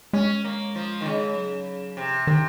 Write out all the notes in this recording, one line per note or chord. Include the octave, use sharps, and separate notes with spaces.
G#3 C#4
A#3
F3
D#3
C#3
F#3
C3 F3
C3 D#3